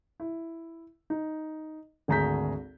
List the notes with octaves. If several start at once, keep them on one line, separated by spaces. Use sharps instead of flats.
E4
D#4
G#1 D2 G#4 A#5 G6 B6